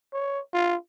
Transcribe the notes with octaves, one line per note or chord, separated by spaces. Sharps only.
C#5
F4